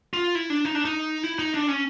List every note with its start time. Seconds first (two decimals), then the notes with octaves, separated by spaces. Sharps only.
0.13 F4
0.35 E4
0.50 D4
0.65 D#4
0.75 D4
0.85 D#4
1.23 E4
1.39 D#4
1.54 D4
1.68 C#4